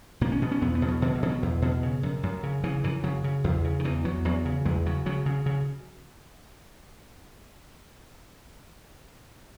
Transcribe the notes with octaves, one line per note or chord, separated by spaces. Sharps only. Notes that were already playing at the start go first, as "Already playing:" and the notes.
B2 A#3
C#4
B2 B3
C#4
E2 B3
B3
B2
F#3
B2 D#3
E3
B2
F#3
E2
B2
C#3
F#2
F#2
C#3
C#3 E3
F#2 E3
C#3 F#3
C#3
E2
C#3
D#3
E2 E3
E2 F#3
E2 F#3
C#3
E2 G#3
C#3 F#3
C#3 F#3
C#3
C#3